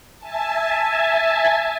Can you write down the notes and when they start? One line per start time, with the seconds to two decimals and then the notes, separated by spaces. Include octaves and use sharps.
0.18 E5 G#5 A5